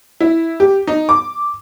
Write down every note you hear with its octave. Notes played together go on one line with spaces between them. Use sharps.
E4
G4
D#4
D6